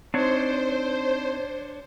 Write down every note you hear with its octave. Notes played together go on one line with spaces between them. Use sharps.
C4 D4 D#4 C5 C#5